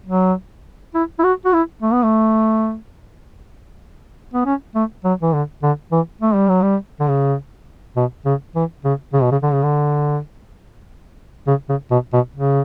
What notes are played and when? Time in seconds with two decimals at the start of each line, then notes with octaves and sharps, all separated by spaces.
0.06 F#3
0.94 E4
1.19 E4
1.24 F#4
1.45 F#4
1.53 E4
1.82 A3
1.93 B3
2.03 A3
4.34 B3
4.45 C#4
4.75 A3
5.04 F#3
5.22 E3
5.34 D3
5.63 D3
5.92 E3
6.21 A3
6.34 G3
6.48 F#3
6.62 G3
7.00 D3
7.08 C#3
7.96 B2
8.25 C#3
8.55 E3
8.84 C#3
9.13 C#3
9.22 B2
9.32 C#3
9.42 D3
9.53 C#3
9.63 D3
11.47 C#3
11.69 C#3
11.91 B2
12.13 B2
12.35 C#3